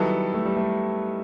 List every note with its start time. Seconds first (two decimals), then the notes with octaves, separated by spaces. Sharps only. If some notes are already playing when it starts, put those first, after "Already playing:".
Already playing: D#3 F#3 G3 B3 E4 A4
0.34 A3
0.45 G3
0.57 A3